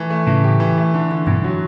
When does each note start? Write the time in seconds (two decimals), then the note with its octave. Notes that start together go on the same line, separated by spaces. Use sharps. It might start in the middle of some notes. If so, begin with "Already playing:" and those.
Already playing: E3 A3
0.10 A3
0.27 A2 C#3 E3
0.44 G4
0.60 E3
0.78 A3
0.94 D3
1.11 D3
1.27 G2 B2 D3
1.44 F#3